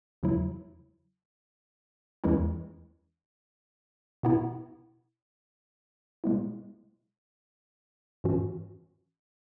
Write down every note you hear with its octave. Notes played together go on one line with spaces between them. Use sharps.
E2 C#3 F#3 E4
E2 E3 G#3 C#4 E4
B2 B3 E4
B2 G#3 B3 E4
G#2 E3 C#4 F#4